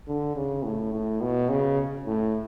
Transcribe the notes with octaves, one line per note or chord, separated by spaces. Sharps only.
D3
C#3
A2
A2
B2
C#3
A2